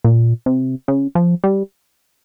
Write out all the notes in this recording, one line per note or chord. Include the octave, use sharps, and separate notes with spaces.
A#2
C3
C#3
F3
G3